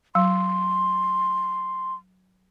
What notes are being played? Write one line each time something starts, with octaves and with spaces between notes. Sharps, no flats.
F#3 C6